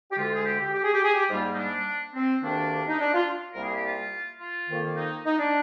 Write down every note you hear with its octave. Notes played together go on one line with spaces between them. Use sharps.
G4
D2 D3 G#3 F4
G#4
G4
G4
G4
G#4
G4
G#4
G4
G#2 G3 A#3 F4
D#4
D4
C4
D2 C3 D#3 A#3 D4
D#4
D4
F4
C2 C3 G3 A#3 A#4
G#4
G4
F4
F4
F2 D#3 A#3
D#4
D#4
D4